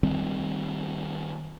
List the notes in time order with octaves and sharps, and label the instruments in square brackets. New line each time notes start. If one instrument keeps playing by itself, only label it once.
[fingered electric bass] D#3 G3 C4